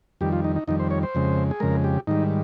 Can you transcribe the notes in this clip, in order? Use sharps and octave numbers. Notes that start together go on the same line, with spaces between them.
F2 D#3 G3 G4
F4
D#4
D#4
F2 D#3 G3 D#4
C5
C#5
C5
F2 C#3 G#3
G#4
F2 C#3 G#3 A#4
G4
G#2 D#3 G3 D#4